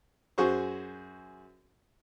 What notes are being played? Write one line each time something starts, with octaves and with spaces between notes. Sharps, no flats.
F#2 F#4 G#4 C5 C#6